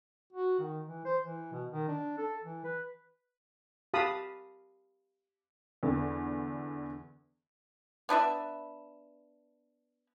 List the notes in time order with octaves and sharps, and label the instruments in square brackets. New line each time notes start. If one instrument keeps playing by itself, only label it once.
[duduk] F#4
D#3
E3
C5
E3
B2
D#3
D4
A4
E3
B4
[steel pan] G4 F5 A5 B5 D#6
[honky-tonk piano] E2 D3
[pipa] B3 D4 B4 E5